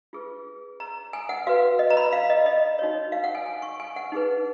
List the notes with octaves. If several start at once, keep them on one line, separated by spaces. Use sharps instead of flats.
F4 G#4 B4
A#5
G#5
F#5
F#4 B4 F5
D#5
A#5
B5
F5
D#5
D#5
D#4 F#4 C#5
F5
F#5
G#5
G#5
C#6
G#5
F#5
D#4 G#4 B4